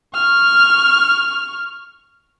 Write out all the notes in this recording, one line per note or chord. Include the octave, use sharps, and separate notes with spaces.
C#6 F6